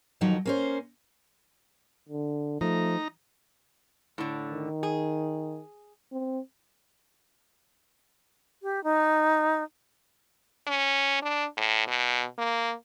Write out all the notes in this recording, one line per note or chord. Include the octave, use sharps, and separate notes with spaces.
F2 D#3 F3 F#3 D#4
A#3 C#4 C5
D3
F3 A3 D#4 A#5
A2 D3
D#3
G#4
C4
G4
D#4
C#4
D4
A2
B2
A#3